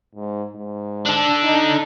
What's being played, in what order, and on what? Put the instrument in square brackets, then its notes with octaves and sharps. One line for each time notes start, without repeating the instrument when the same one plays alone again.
[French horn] G#2
G#2
[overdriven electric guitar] D4 A4
[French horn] D#4